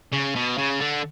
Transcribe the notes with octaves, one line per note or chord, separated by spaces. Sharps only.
C#3
B2
C#3
D3